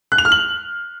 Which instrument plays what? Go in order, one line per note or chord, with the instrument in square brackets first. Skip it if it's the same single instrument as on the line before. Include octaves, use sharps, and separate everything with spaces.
[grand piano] F#6
F7
F6
F#7